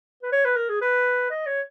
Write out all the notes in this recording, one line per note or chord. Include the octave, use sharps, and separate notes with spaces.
B4
C#5
B4
A#4
G#4
B4
D#5
C#5